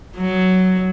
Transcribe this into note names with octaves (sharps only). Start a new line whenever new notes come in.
F#3